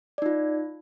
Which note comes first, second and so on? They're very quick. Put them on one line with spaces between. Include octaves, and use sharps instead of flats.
D5 D#4 F4